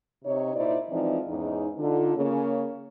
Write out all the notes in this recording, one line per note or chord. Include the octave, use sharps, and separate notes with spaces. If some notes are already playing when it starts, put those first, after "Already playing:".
C3 D#4 C#5
A#2 D#4 E4 C5 D5
E3 F3 G#3 C4 D#4 D5
E2 G#2 C#4 D#4
D3 D#4 F4
C#3 A#3 C#4